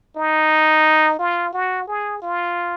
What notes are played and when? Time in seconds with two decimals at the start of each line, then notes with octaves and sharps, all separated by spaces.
0.16 D#4
1.19 F4
1.53 F#4
1.88 G#4
2.22 F4